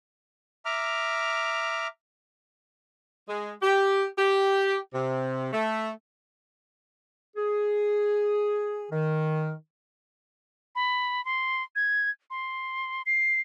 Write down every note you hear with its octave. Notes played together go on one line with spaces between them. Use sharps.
E5 A#5 D6 F6
G#3
G4
G4
C3
A3
G#4
D#3
B5
C6
G#6
C6
C7